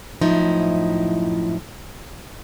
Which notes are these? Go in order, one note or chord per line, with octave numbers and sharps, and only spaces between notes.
F#2 A2 F3 D#4 E4